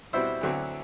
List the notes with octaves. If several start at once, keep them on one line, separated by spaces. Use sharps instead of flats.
B2 G3 C4 E4 F#4 C5
D2 D3 F#3 C4 F#4